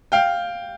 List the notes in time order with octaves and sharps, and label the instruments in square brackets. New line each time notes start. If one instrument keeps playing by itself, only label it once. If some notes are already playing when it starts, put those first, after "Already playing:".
[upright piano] F5 G5